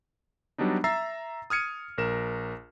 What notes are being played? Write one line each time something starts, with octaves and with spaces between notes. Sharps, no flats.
F#3 G3 B3 D4 D#4
E5 A#5 E6 A6 C7
D#6 F6 G#6 C#7 D#7
A#1 A#4 E7